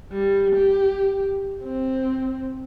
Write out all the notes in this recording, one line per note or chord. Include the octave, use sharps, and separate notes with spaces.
G3
G4
C4